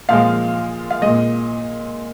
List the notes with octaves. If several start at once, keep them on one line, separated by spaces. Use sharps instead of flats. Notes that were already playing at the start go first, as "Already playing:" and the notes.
A#2 F3 G#3 F5
F5
A#2 G#3 D#5